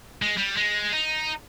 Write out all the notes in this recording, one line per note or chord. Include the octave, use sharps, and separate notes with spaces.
G#3
G3
G#3
D#4